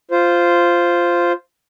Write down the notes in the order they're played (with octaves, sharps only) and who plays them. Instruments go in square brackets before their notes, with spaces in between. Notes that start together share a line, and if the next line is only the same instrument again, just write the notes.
[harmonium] F4 C5